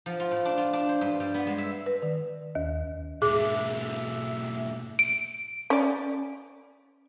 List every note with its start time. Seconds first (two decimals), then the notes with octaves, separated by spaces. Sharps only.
0.06 F3
0.20 F4
0.31 A2
0.45 D4
0.57 F4
0.73 D4
0.89 C5
1.01 G2
1.20 G3
1.34 B3
1.47 G#3
1.58 E5
1.86 B4
2.02 D#3
2.55 D#2
3.22 G#2 B2 G#4 E5 D6
4.99 D7
5.70 C#4 D5